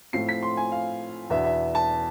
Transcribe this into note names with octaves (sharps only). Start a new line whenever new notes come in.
A2 F3 A3 C4 C7
B6
C6
G#5
F5
E2 B2 B3 D4 E5
E5
A5